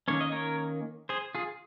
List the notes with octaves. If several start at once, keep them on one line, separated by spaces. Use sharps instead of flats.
D#3 A#3 C#4 C#5
D#5
A#4 C#5
G#4 C5
F4 G#4